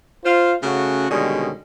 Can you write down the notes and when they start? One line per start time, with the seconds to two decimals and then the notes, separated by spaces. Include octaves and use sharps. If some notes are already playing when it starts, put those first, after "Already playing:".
0.25 F4 C5 F5
0.63 C#3 A3 C#4 F#4
1.10 B2 D3 D#3 G3 G#3 C#4